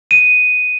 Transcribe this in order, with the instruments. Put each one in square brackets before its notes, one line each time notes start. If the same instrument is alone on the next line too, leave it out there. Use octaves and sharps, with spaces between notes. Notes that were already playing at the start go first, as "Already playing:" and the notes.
[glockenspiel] D#7